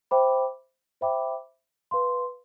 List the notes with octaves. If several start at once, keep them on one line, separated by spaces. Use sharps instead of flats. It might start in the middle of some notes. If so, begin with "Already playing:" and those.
C5 E5 G5 B5 D6
C5 E5 G5 B5 D6
B4 F5 C6